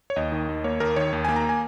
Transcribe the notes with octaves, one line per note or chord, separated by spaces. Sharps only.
C#5
D#2 D#5
D#3
D#2
A#3 C#5
D#2 A#4
D#3 C#5
D#2
A#3 G#5
A#5
G#5